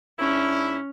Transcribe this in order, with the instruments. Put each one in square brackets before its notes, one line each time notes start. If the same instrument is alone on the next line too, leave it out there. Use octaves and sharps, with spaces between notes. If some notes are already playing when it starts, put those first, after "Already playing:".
[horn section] G#2 D4 E4 [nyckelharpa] C#4